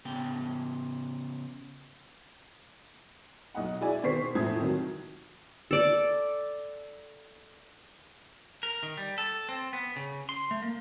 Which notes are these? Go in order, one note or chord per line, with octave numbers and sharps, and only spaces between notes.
C#3 B3 G5
B1 D#5 F#5
G#3 E4 F#4 D5 G#5
B2 D#3 C5 C#6 B6 C7
E2 A2 F3 E4 D#6 G#6
C3 D#3 F#3
A4 D5
A#4
D#3
G3
A4
C4
B3
C#3
C6
A3
A#3